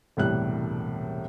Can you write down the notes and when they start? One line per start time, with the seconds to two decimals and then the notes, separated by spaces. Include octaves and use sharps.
0.17 E1 C2 A2 G3 F#6